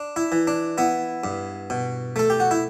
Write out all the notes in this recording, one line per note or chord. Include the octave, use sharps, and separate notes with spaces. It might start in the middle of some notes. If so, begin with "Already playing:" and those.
Already playing: D4
E4
E3
D4
B3 E4
G2
B2
A3 A4
G4
F#4
E4